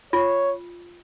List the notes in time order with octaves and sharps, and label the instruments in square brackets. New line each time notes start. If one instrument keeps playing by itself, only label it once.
[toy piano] F4 [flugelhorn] C#5